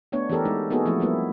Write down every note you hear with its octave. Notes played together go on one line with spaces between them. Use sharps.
A3 B3 D4 C#5
E3 B3 G4 A4 A#4
G#3 D#4
A#3 B3 D#4 F#4 G#4 A4
F3 A3 C4 E4
G3 A#3 B3 E4